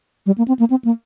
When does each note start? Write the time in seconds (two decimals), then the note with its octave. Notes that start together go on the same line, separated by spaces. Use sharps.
0.26 G3
0.38 A#3
0.48 C4
0.59 A#3
0.70 C4
0.85 A#3